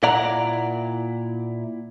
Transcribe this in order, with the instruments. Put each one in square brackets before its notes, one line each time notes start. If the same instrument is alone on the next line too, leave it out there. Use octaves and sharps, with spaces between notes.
[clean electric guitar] A#2 E4 D5 F#5 A#5